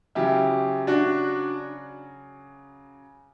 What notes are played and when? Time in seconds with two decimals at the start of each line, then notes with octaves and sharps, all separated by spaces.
0.15 C#3 F#3 E4 G4
0.87 D4 F#4